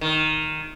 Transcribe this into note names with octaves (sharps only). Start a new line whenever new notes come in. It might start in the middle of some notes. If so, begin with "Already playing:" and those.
D#3